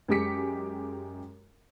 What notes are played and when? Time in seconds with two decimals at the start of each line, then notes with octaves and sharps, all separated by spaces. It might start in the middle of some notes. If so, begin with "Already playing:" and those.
0.08 F#2 G#3 G4 D6 B6 C#7